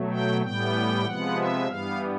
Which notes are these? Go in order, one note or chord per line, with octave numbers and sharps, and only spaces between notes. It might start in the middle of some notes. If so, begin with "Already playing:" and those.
Already playing: B2 F#3 A3
G5
A2 E3 G3 B3 G5
C3 F3 G#3 B3 F#5
E5
G2 E3 G3 B3 F5